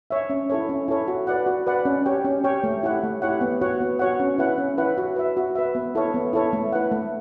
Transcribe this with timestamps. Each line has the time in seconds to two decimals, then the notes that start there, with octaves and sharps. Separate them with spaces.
0.11 C#5 E5
0.30 C#4
0.50 E4 A4 C#5
0.69 C#4
0.88 E4 A4 C#5
1.08 F#4
1.27 B4 D5 F#5
1.46 F#4
1.67 B4 D5 F#5
1.85 C#4
2.06 G4 C#5 G5
2.25 C#4
2.44 G4 C#5 G5
2.64 A3
2.83 E4 G4 C#5 F#5
3.03 A3
3.22 E4 G4 C#5 F#5
3.41 B3
3.61 F#4 C#5 F#5
3.81 B3
3.99 F#4 C#5 F#5
4.20 C#4
4.38 E4 B4 F#5
4.58 C#4
4.78 E4 B4 F#5
4.98 F#4
5.16 B4 E5
5.37 F#4
5.56 B4 E5
5.75 B3
5.95 E4 A4 C#5
6.14 B3
6.33 E4 A4 C#5
6.53 A3
6.73 E4 B4 F#5
6.92 A3